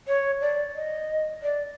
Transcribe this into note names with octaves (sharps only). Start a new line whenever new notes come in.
C#5
D5
D#5
D5